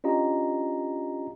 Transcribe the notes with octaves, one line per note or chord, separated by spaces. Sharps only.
C#4 D4 F4 G4 D#5 A#5